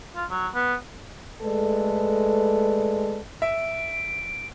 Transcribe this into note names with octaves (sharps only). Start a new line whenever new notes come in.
F4
F#3
B3
G#3 A3 A4 B4 D5
E5 D7